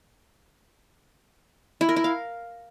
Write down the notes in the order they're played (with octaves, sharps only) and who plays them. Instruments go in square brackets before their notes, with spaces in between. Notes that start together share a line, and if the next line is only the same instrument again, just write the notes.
[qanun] E4
A#4
E4
F5